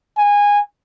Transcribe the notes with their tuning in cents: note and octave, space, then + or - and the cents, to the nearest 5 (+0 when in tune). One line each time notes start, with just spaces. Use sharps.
G#5 -20